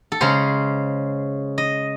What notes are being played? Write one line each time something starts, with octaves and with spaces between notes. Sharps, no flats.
A4
C#3 G#3 C#4 C5
D#5